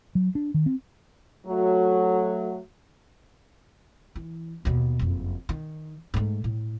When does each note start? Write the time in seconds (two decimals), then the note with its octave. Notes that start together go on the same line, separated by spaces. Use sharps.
0.15 F#3
0.35 D4
0.54 D#3
0.66 C4
1.47 F#3 A3 F#4
4.15 E3
4.65 D#2 B2
4.99 F#1 F2
5.49 D#3
6.14 G#2 A3
6.44 A2